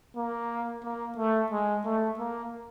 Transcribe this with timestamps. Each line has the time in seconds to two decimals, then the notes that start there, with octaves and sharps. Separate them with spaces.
0.16 A#3
0.83 A#3
1.17 A3
1.52 G#3
1.85 A3
2.19 A#3